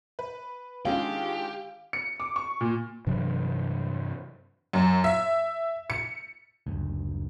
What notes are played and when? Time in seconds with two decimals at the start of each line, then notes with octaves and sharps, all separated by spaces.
0.19 B4
0.85 D3 D#3 G#3 C#4 F4 G4 G#4 F5
1.93 C#7
2.20 D6
2.36 C#6
2.61 A#2
3.07 G2 C3 E3 F#3
4.73 F#2
5.04 E5
5.90 C#7
6.67 F#1 D2